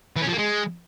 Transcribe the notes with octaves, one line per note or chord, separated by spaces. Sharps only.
E3
C#4
F3
A#3
G#3